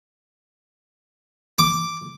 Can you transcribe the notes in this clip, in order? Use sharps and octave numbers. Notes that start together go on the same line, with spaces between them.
D6